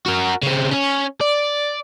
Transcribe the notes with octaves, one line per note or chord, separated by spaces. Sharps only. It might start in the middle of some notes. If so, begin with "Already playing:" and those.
F#4 A#4
C#3 C4
C#4 C#5
D5